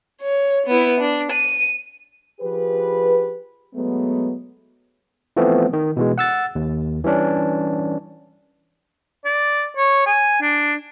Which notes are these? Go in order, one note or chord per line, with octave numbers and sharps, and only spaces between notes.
C#5
B3 E4
D4
D#7
F3 G4 G#4 B4
F#3 G#3 A3 B3
E3 F3 A3 B3 C4
D#3
B2 E3 G#3
F#5 E6 A6
D#2
E3 G3 C#4 D4
D5
C#5
G#5
D4